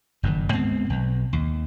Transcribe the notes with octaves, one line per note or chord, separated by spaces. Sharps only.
F#1 G2 A#2 D#3
D2 G#2 B3 C4
B1
D#2